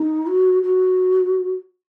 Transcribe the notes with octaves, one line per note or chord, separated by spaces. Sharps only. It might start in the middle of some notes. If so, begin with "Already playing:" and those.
Already playing: D#4
F#4
F#4